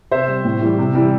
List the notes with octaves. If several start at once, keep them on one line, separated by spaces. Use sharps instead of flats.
C3 C5 E5
G3
A2
E3 G3
C3
E3 G3